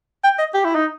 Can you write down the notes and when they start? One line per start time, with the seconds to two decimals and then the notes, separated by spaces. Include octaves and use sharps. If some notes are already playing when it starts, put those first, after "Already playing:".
0.24 G5
0.38 D#5
0.54 G4
0.64 E4
0.75 D#4